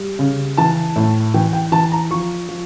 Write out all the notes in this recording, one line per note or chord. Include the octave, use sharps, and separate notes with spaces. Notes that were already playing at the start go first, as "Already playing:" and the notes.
Already playing: G3
C#3
E3 A5
A2
E3 G5
G5
E3 A5
A#5
F3 C#6
F3